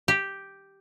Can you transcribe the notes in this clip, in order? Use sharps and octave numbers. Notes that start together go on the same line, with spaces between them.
G4